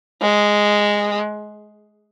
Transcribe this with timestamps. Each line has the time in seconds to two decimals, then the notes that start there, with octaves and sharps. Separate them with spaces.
0.22 G#3